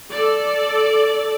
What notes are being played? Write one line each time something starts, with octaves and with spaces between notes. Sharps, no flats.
A4 D5